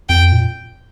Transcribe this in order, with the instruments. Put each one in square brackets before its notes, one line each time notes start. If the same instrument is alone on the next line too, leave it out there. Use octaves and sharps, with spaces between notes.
[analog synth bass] F2 [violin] G5
[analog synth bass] A#2